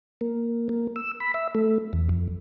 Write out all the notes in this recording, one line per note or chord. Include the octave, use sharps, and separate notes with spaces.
A#3
A#3
E6
B5
E5
A3
E2
F2